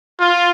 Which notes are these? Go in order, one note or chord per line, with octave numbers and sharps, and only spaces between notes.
F4